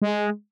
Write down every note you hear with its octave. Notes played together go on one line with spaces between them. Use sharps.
G#3